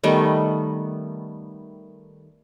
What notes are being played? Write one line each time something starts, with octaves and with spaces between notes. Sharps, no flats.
D#3 G3 A3 B3